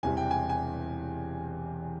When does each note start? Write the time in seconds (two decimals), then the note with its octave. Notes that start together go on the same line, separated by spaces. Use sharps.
0.03 E1 E2 C3 E3 G3 G#5
0.17 G5
0.31 G#5
0.49 G#5